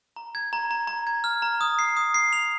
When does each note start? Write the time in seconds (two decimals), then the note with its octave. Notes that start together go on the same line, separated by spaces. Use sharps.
0.16 A#5
0.35 G#6
0.53 A#5
0.71 A#5
0.87 A#5
1.07 G#6
1.24 F6
1.42 A#5
1.61 D#6
1.79 C7
1.97 D#6
2.14 C7
2.33 F7